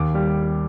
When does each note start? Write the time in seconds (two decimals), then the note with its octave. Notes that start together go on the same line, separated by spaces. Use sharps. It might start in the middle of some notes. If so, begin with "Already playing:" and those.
Already playing: D#2 D6
0.14 G3